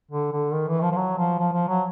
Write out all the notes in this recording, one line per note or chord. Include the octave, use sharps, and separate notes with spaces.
D3
D3
D#3
E3
F3
F3
F#3
F3
F3
F3
F#3